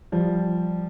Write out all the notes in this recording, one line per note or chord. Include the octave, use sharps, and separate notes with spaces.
F3 G3